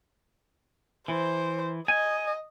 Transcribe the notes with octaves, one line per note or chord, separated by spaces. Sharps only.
E3 C5
D#5 G#5